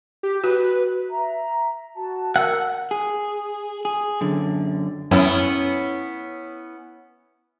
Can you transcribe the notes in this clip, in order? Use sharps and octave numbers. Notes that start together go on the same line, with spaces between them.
G4
F#4 B4
E5 A#5
F#4 A5
A#4 F#5 E6
G#4
G#4
F#2 D3
F#2 B3 C#4 E4